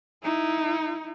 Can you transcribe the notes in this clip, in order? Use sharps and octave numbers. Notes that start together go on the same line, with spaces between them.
D#4 E4